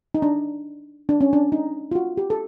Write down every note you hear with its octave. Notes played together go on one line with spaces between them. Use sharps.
D#4
D4
D4
C#4
D4
D#4
F4
F#4
G4
A4